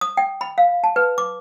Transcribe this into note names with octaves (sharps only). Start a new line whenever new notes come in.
D#6
G5
B5
F5
A5
B4
D6